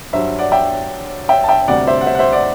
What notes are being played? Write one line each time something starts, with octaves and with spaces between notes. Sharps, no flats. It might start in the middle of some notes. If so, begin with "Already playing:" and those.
G2 F#3 C5 E5
D5 F#5
E5 G5
E5 G5
A5
E5 G5
D2 C3 G3 D5 F#5
C5 E5
F#5
C5 E5
F#5
C5 E5
D5 F#5